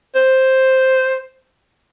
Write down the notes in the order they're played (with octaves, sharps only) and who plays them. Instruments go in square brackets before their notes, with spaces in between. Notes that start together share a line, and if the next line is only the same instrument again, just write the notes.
[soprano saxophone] C5